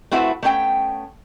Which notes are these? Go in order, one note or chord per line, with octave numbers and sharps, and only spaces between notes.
A3 C4 E4 F#4 B4 E5
A3 B3 C#4 D#5 G5